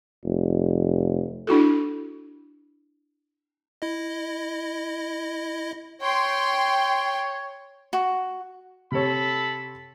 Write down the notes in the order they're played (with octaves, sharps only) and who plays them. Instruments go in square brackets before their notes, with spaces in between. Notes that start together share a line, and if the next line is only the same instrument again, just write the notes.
[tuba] F1
[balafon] D4 E4 F#4 A4
[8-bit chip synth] E4 D#5
[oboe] C#5 [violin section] G5 C6
[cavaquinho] F#4
[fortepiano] C3 C#5 [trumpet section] A4 B5